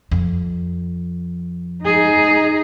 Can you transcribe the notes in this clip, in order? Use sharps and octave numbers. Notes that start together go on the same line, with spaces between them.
F2
D#4 G#4